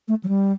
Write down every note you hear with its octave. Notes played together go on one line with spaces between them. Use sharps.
A3
F#3
G3